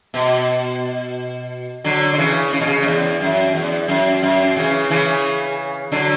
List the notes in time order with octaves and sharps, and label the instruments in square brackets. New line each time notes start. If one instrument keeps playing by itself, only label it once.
[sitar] B2
D3 F#3
D3
C#3 E3
C#3
B2
C#3
F#2
E2
F#2
E2
F#2
F#2
C#3 E3
C#3 E3
D3 F#3